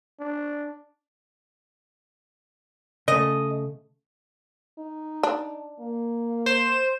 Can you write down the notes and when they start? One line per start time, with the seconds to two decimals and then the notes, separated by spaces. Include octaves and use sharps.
0.20 D4
3.08 C#3 A3 D#5
4.78 D#4
5.23 D4
5.80 A#3
6.46 C5 E7